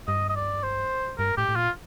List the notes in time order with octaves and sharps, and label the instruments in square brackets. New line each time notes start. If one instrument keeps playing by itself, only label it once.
[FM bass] G2 [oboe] D#5
[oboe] D#5
D5
C5
[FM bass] G2 [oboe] A#4
[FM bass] A2 [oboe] G4
[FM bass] A2
[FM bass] A#2 [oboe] F4